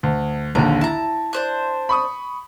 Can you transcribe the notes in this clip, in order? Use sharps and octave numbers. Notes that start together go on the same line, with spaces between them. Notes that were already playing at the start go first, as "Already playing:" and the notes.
D2
A#1 D#2 D3 A#5
E4 A5 A#5
D4 C5 F#6
B5 C#6 D#6